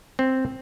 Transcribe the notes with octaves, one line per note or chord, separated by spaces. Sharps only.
C4